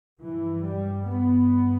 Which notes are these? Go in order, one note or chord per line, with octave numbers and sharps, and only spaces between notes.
G2 E3
G3
B3